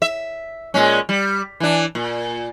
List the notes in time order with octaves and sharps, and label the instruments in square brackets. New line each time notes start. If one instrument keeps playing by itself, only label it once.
[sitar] E5
A#2 G#3 C#4
G3
E3 D4
A#2